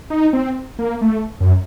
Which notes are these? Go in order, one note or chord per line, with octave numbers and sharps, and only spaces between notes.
D#4
C4
A#3
A3
F#2